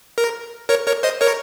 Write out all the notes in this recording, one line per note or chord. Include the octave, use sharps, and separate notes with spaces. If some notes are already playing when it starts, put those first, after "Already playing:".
A#4
A#4 C#5
A#4 C#5
C5 D#5
A#4 C#5